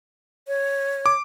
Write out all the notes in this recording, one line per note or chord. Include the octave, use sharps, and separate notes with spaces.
C#5
D6